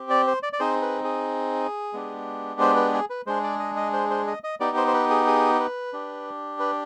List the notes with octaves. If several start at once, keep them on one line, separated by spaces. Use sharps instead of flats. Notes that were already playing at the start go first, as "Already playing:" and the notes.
Already playing: C4 G4
D5
C5
D5
D5
C4 D#4 G#4 C5
B4
G#4
G#3 B3 D4 G4
C5
B4
G#4
B4
G#3 D4 G#4 C5
D5
D#5
D#5
C5
C5
D#5
D#5
B3 D#4 G4 D5
C5
C5
B4
G#4
G#4
B4
D4 G4
B4